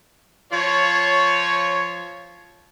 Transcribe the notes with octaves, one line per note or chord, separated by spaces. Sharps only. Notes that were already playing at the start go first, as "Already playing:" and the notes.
F3 F4 C#5